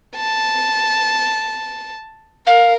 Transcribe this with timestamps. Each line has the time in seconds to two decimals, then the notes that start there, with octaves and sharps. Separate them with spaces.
0.16 A5
2.47 A#4 F5